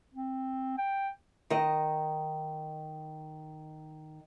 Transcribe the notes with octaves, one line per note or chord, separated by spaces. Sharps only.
C4
G5
D#3 D#5